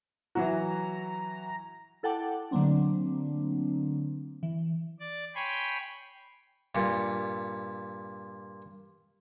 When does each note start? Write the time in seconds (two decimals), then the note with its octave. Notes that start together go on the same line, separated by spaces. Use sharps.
0.35 E3 F#3 F#4 A#5
2.03 E4 A4 F#5 G5 A5 D6
2.51 D3 F#3 A3 A#3 C4 D4
4.43 E3
5.00 D5
5.35 C#5 G5 G#5 B5 C6
6.75 G2 A#2